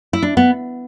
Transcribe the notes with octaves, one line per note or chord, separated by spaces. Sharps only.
E4
D4
B3